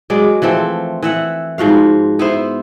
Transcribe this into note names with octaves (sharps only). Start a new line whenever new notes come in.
F#3 G#3 D5
E3 F3 A3 C4
E3 E5 F#5
G#2 F3 F#4 F5
B3 E4 C5